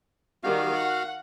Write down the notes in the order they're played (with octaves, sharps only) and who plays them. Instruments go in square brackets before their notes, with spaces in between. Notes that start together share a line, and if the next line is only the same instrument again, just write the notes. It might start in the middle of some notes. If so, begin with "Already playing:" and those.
[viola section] D#3 G3 [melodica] F#4 F5
[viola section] F#5